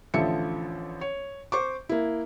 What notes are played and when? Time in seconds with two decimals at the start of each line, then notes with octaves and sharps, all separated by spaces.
0.14 A1 D3 F3 A4 E5 C#7
1.01 C#5
1.52 C5 C#6 D6
1.89 A#3 E4